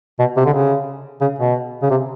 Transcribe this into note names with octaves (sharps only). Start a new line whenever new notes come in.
B2
C3
D3
C#3
C#3
B2
C#3
C3